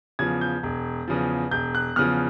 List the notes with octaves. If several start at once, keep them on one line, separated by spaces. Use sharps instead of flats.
E2 C#3 F3 G#6
G6
E1
E2 C#3 F3
E1 G6
F#6
E2 C#3 F3 F6